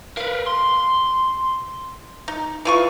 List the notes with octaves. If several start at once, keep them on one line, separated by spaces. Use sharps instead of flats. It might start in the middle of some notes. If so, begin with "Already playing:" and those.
A#4 B4 F5
C6
D#4
E3 F4 C#6